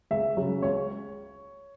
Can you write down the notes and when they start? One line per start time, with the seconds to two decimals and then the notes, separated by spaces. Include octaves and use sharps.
0.11 C#2 E5
0.37 C#3 F#3
0.62 C#2 C#5